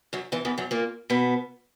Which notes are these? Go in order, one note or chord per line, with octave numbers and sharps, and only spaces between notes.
F#2 F#3
E2 E3
E2 E3
F#2 F#3
A#2 A#3
B2 B3